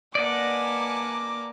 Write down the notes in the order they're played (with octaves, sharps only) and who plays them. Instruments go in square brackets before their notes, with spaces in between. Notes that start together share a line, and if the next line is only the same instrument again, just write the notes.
[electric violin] A#3 D6 [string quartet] B4 G#5 A5 [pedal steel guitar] D5 D#5 F#5